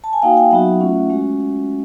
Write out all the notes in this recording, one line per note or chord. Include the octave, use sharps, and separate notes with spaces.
A5
G#5
A#3 D#4 F#4 F5 G5
F5 G5
F#3 B3 D#4 F#4 E5 F#5
A3 C#4 F4
G#3 C#4 F#4